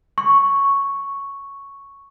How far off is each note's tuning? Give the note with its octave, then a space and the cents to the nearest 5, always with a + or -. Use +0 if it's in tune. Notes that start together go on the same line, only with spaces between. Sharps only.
C#6 +0